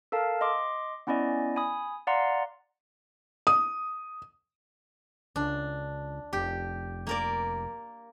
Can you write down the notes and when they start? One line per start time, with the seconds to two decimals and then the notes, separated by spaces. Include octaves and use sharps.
0.12 A4 A#4 F5 A5
0.41 D#5 C6 D6
1.07 B3 C#4 E4 D5 D#5 G#5
1.56 G#5 B5 D#6
2.07 D5 F5 F#5 A#5 C6
3.47 D#6
5.36 C#2 D4
6.33 F1 G4
7.07 A#3 A#4 D5